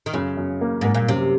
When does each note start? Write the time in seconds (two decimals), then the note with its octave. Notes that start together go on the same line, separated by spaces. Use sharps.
0.06 D#3
0.13 F#2 C#3
0.37 F#2
0.61 A#3
0.81 G#2 A#3
0.95 A#2
1.08 F#2 C3